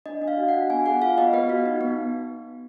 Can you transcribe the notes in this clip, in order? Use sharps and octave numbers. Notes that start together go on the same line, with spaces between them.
D4 D#5
D4
F5
F#4
F#5
F#4
B3 G#5
G#4 F#5
F4 F5
B3 D#5
B3 B4
F#4
D#4
B3